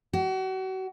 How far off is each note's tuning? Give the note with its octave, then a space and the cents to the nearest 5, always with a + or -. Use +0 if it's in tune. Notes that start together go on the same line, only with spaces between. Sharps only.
F#4 +35